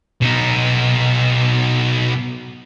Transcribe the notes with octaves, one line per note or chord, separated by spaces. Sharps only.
B2 D#4